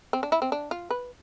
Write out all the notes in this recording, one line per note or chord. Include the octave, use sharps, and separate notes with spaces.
C4
D4
E4
C4
D4
F4
B4